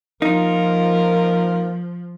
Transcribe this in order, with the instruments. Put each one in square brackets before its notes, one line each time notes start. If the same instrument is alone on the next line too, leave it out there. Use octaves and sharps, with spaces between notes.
[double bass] F3 [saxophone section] A#3 F4 A#4 [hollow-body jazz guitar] D#4